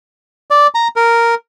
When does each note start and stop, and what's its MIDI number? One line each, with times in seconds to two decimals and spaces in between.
0.51 0.67 74
0.75 0.88 82
0.96 1.35 70